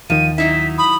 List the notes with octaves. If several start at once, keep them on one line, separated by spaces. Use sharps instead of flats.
D#2 D#3 F3 D#7
F#3 D#4 E4 B6
B5 D#6